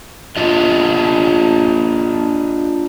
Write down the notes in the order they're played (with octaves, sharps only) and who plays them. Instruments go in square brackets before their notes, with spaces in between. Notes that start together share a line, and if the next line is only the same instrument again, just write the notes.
[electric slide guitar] D4 F4 D#5